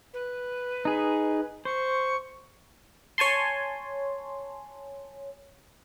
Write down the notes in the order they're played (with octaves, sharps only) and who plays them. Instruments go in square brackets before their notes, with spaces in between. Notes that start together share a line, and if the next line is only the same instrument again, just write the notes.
[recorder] B4
[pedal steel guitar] D#4 G#4
[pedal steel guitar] C5 [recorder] C#6
[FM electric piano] C#5 G#5 A5 C6